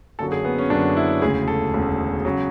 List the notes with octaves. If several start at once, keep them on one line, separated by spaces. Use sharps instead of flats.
F#1 F#2 D3 F#3 A4
G#4
B3
C#4
F#1 F#2 D3 F#3 D4
E4
E1 D2 C#3 G#4
A4
E1 D2 C#3
C#3 F#3